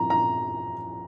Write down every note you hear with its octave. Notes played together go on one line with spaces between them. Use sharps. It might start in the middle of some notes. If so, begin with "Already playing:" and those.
Already playing: G2 F3 C4 A#5
A#5